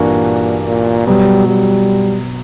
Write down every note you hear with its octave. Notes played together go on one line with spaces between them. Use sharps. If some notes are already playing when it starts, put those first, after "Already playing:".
Already playing: G2 A#2 E3 A#3 D4 F#4
A#2
B2 F#3 G3 B3
G3